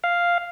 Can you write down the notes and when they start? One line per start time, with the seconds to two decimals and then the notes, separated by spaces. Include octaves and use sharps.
0.04 F5